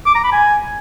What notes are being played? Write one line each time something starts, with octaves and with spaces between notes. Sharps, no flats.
D6
A#5
B5
G#5